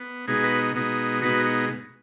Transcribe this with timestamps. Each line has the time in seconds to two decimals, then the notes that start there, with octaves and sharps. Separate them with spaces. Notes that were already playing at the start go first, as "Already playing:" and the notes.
Already playing: B3
0.27 B2 G#3 B3 D#4 G#4
0.43 F#4 B4
0.75 B2 G#3 B3 D#4
1.21 B2 G#3 B3 D#4 F#4 B4